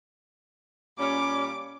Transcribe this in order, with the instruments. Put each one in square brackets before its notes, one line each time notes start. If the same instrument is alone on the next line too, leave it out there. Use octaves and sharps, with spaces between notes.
[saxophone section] A#2 G3 C#4 [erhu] D6